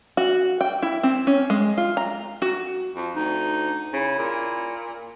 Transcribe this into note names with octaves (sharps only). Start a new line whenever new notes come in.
F#4
G5
E4
C4
C#4
G#3
F4
A#5
F#4
F2
D2 D#4
C#3 E4
A#2